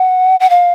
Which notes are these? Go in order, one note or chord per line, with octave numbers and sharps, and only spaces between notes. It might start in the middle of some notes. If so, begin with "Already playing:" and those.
Already playing: F#5
F#5
F5